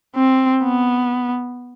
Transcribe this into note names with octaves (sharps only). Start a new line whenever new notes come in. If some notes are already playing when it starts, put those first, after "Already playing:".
C4
B3